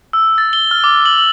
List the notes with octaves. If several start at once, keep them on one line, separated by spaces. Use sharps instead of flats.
E6
A6
G7
F6
D6
F#7
F#7